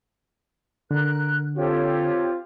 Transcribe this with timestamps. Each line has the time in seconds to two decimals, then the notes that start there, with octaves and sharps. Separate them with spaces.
0.91 D3 A#4 F#6
1.56 C4 F4 G4 A4 C#5